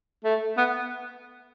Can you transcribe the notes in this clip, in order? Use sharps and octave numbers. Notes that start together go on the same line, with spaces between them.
A3
B3